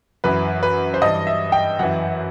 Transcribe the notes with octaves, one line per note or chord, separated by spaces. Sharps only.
F#2 E3 B4
B4
C5
G2 E3 D#5
E5
G5
F#2 E3 F#5